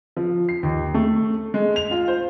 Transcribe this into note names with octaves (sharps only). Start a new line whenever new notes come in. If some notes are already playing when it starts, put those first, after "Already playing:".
F3
C7
D#2
A3
G#3
F7
F4
C5